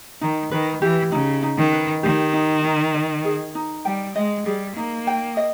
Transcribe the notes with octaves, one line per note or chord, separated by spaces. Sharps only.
D#3 D#4
D#3 B4
E3 G4
C#3 D#4
D#4
D#3
B4
D#3 G4
D#4
D#4
D#5
G#4
D#4
G3 G5
G#3 D#5
G3 G#4
A#3 D#4
G5
D#5